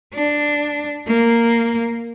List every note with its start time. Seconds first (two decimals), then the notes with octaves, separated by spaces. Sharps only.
0.14 D4
1.07 A#3